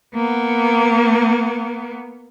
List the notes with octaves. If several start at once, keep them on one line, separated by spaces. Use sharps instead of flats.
A#3 B3